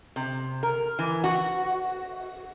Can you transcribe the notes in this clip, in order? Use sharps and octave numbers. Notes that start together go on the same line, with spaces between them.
C3
A#4
E3
F#4